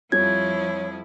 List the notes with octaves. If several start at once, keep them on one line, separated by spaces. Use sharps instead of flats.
F2 F3 G3 E4 C#5 G#6